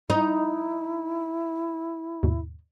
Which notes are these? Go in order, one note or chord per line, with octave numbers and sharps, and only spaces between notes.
D#4 E4 D#7
D#2 G#2 B2